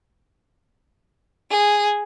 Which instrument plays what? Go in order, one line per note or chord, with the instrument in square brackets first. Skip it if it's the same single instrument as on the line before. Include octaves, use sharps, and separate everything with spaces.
[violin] G#4